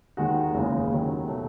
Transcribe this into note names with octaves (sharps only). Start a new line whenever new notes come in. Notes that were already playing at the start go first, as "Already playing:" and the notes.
D#2 D#3 G#3 D#4 F#4
F#1 E2 C#3 E3 G#3
D#2 D#3 F#3 C#4
B2 F#3 A3